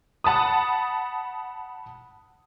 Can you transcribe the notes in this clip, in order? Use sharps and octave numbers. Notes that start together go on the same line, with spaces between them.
F#5 A5 B5 D#6